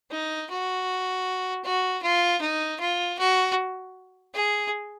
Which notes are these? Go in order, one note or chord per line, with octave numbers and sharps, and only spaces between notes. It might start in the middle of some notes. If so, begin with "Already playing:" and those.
D#4
F#4
F#4
F4
D#4
F4
F#4
G#4